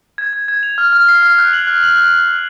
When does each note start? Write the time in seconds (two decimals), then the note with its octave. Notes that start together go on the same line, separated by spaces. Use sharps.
0.18 G#6
0.33 G#6
0.48 G#6
0.63 F7
0.78 F6
0.93 F6
1.09 C7
1.23 F6
1.38 F#6
1.53 F#7
1.67 F#6
1.83 F#7
1.97 F#6
2.13 F#6
2.28 F#6